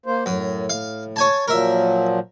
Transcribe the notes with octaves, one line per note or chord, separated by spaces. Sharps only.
A#3 C5
F#2 A2
F5
C#5 G#5 A5
A#2 F3 F#3 A#4 E5